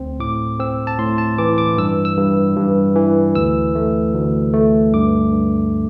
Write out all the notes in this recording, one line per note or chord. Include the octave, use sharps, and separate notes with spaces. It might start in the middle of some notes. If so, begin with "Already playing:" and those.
Already playing: D2 C4
A2 D6
C4 E6
A5
A2 C6
A5
E3 D6
D6
G2 E6
E6
G2
G2
E3
D2 E6
A3
D2
A3
G2 D6
G2